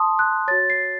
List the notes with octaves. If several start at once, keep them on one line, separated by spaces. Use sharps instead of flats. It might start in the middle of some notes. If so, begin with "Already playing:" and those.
Already playing: A5 C6 D#6
F#6
F#4 C#5 A6
C7